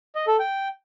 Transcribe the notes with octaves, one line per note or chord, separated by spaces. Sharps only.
D#5
A4
G5